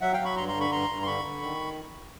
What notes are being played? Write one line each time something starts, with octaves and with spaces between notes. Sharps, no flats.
F#3 E5 F#5
F5 G5
F#3
B5 C#6
G2 A#5 C6
A#5 C6
D3
B5 C#6
G2 A#5 C6
G2
C6
D3 B5 C#6
D3
D#3